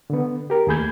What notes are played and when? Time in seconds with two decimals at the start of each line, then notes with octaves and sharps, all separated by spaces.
0.10 D3 B3
0.50 G4 A#4
0.67 D#2 A3 G#4 B5 G6 G#6